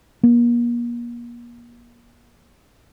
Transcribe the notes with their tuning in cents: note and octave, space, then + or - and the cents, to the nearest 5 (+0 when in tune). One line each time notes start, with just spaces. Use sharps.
A#3 +40